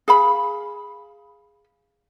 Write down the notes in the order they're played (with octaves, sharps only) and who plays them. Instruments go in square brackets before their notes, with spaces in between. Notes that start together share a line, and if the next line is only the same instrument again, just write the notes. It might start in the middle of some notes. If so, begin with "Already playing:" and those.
[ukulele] G#4 F5 B5